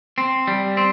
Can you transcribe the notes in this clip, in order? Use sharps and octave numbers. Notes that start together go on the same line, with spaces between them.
C4
G3
C4